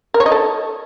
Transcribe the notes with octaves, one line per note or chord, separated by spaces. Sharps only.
A#4
C#5
D#5
A4